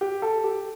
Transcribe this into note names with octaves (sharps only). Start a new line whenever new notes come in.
G4
A4
G4